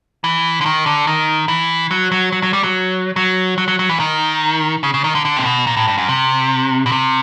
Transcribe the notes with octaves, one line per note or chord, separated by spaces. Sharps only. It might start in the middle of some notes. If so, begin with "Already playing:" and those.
E3
D3
D#3
D3
D#3
E3
F#3
F#3
F#3
F#3
G3
F#3
F#3
F#3
F#3
F#3
E3
D#3
C#3
C#3
D#3
D3
D3
C3
B2
A#2
A2
G2
F#2
C3
B2
C3